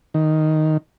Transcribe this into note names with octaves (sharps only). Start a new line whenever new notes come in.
D#3